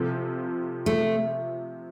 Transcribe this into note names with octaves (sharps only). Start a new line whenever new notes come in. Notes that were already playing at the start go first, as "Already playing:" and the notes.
Already playing: C3 F3 A3
A3